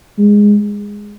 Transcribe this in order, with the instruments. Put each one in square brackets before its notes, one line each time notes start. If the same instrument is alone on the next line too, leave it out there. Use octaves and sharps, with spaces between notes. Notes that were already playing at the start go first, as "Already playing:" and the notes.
[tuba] G#3